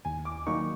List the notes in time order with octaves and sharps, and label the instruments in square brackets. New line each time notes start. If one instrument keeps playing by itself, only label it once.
[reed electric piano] D#2 [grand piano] G#5
[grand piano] D6
[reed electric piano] D#3 F#3 A#3 D#4 [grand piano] C#6